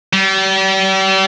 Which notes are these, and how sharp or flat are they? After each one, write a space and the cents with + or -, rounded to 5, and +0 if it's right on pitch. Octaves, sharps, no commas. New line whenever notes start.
G3 -40